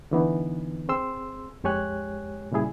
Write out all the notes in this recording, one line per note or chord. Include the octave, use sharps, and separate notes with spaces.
D3 E3 B3 D#4
C4 G#4 C6 E6
F2 G#3 G4 C#5 G#5 F#6
A#2 C#3 G3 E4 G#4